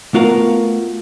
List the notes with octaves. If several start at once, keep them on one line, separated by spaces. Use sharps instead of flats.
A3 B3 F4 F#4 A#4 F5